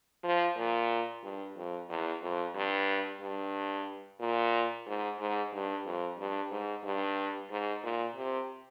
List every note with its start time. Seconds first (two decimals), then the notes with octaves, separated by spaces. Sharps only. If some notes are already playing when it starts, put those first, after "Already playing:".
0.24 F3
0.57 A#2
1.23 G2
1.56 F2
1.89 E2
2.22 F2
2.55 G2
3.21 G2
4.20 A#2
4.86 G#2
5.19 G#2
5.53 G2
5.85 F2
6.19 G2
6.51 G#2
6.84 G2
7.50 G#2
7.83 A#2
8.16 C3